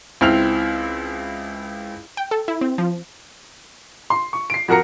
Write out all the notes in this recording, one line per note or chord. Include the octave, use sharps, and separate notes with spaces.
C#2 C4 E4 F6 F7
G5
A4
E4
C4
F3
C6
C#6
C7 D7
F2 F#4 A#4 A#5 C#7